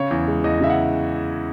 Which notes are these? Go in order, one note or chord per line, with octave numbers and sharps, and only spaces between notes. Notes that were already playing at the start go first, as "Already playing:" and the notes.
Already playing: C#3 C#5
E2
G#3
E2 D#5
C#3 E5
F#5